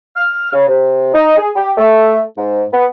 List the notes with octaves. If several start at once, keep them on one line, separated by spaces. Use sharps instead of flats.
F6
C#3
C3
D#4
G#4
G4
A3
G#2
B3